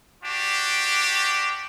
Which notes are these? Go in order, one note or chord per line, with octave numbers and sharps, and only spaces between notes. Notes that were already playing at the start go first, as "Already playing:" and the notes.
D4 F#4 G4